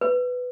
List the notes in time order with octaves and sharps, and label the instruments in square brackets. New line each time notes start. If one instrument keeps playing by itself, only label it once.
[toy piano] B4